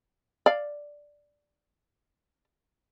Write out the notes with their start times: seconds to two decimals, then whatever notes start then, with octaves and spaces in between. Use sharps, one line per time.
0.46 D5 F5